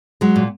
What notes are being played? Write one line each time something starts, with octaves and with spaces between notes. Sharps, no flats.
F#3 G#3
A#2